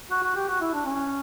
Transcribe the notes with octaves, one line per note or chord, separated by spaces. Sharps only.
F#4
F#4
G4
F#4
E4
D4
C#4